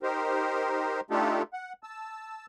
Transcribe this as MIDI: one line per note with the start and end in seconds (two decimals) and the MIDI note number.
0.03 1.01 63
0.03 1.01 67
0.03 1.01 70
0.03 1.01 72
1.11 1.42 57
1.11 1.42 62
1.11 1.42 63
1.11 1.42 65
1.11 1.42 67
1.11 1.42 69
1.53 1.73 78
1.83 2.46 81
1.83 2.46 88